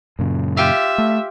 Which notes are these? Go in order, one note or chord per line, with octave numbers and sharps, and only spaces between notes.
F#2 A#2 C#3
F4 G4 E5 F5
A3